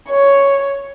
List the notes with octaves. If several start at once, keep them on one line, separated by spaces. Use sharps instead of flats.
C#5